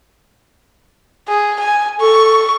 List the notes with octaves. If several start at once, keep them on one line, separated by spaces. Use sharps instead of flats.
G#4
G#5
A4 C#6